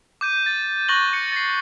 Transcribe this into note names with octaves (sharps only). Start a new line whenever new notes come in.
D6 G6 D#7
A6
C#6 F#6 A6 A#6 F#7 G7
C#7
A6 C7